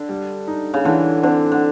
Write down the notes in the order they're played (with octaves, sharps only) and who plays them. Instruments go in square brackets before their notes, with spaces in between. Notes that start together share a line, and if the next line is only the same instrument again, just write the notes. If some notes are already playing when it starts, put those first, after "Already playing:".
Already playing: [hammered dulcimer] D3
[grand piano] G3
D#4
[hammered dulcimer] C#3
[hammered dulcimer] D3 [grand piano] E3
[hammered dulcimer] D3 [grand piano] C4
[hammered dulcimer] D3